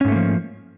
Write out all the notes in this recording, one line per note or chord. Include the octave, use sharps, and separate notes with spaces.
G#2 F3 A3 A#3 C#4